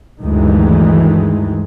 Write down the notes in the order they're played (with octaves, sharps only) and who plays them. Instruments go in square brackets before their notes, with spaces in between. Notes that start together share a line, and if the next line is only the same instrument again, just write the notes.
[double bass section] D2 G2 D#3 E3 G#3